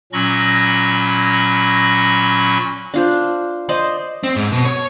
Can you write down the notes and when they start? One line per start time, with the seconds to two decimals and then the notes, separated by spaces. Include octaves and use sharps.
0.13 A#2 F#3 C#4 B5 C#6 A#6
2.94 D4 F4 C5
3.69 C5 D5 D#5
4.24 C4
4.36 G#2
4.52 B2
4.65 C#5